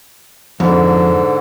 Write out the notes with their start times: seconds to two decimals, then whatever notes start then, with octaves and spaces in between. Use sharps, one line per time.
0.60 F2 G#2 D3